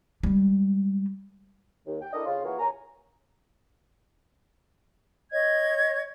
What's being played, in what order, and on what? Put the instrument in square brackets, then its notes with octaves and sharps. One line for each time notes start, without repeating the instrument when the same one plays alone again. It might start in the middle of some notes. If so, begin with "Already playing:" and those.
[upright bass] G3 G#3
[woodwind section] D#2
G5
D4 E4 A4 A#4 D#5
C#3 F4
E3 A#3 F4 F#4 G#4 A#4
D#2 C#5 G#5 A#5
[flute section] C#5 D#5 G#6